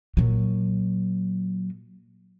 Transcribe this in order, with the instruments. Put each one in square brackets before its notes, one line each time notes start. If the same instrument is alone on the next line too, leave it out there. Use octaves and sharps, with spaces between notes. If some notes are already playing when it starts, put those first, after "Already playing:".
[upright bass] A#2 F#3